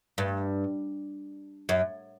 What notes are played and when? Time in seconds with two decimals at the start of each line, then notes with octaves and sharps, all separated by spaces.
0.18 G2
1.69 F#2